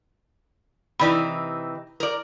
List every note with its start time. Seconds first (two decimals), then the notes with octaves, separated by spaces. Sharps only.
1.00 C3 E3 D#4 D5 B5
2.00 A#4 D5